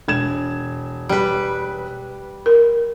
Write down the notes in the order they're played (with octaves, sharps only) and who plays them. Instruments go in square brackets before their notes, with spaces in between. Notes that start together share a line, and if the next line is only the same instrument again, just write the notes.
[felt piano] E1 G#6 E7
[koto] G3 B4
[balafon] A#4